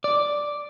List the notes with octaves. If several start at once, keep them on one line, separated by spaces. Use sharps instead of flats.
D5